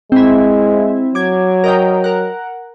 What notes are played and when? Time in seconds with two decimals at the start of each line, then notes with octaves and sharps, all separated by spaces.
0.12 G#3 C4 E4
1.15 F#3 D6 G#6
1.64 A#4 D#5 G5
2.04 A#4 F#5